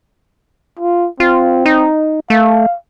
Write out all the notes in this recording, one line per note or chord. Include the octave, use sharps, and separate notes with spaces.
F4
C4 F4
D#4
A3 F5